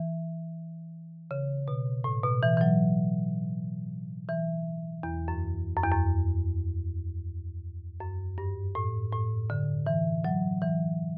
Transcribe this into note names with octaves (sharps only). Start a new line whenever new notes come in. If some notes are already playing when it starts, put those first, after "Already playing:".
Already playing: E3
C#3
B2
A2
B2
E3
E3
F#3
E3
E2
F#2
F#2
E2
F#2
F#2
G2
A2
A2
D3
E3
F#3
E3